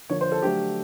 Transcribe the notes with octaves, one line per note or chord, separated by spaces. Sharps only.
D3 F3 A#3 C#5
C5
A4
D3 F#3 A3 G4